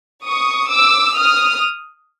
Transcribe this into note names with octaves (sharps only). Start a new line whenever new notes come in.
C#6 D#6
D6 E6
D#6 F6